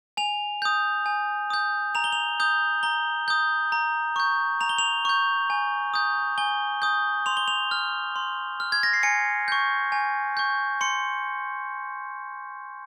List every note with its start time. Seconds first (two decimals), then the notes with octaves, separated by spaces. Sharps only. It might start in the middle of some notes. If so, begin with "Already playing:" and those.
0.17 G#5 F7
0.62 D#6 G6
1.06 G#5
1.50 D#6 G6
1.95 A#5 F7
2.04 G7
2.12 F7
2.40 D#6 G6
2.83 A#5 G7
3.28 D#6 G6
3.72 A#5
4.16 C#6 G6
4.61 A#5 F7
4.69 G7
4.78 F7
5.05 C#6 G6
5.50 G#5
5.94 D#6 G6
6.38 G#5 G7
6.82 D#6 G6
7.26 C6 F7
7.37 G7
7.48 F7
7.71 F6
8.16 C6
8.60 F6
8.72 G#6
8.83 A#6
8.93 C7
9.03 G#5 C#7
9.48 C#6 G6
9.92 G#5
10.37 C#6 G6
10.81 C6 C#7